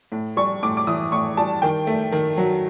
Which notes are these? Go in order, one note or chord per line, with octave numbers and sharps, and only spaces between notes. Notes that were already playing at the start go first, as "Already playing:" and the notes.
A2
G3 C#6
A2 D6
D6
E3 D#6
A2 C#6
G3 A5
D#3 G5
A3
D#3
F#3